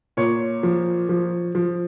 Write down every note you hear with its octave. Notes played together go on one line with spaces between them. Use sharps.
A#2 C#5
F3
F3
F3